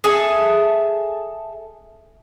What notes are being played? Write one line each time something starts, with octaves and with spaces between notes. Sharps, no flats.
G#4 A4 E5 G#5